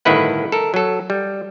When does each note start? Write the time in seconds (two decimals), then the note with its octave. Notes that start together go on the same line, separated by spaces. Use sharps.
0.05 G1 A2 D#3 E4 B4 F#5
0.52 A4 A#4
0.74 F#3 A4
1.10 G3